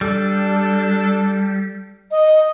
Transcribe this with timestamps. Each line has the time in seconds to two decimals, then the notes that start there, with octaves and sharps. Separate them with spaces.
0.01 G3 D4 A4
2.11 D#5